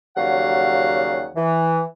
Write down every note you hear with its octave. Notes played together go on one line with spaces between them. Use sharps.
D#2 C#3 F#3 G3 F5 F#5
E3